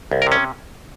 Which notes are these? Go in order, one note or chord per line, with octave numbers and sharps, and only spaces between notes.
C2
A#4
C3
C#4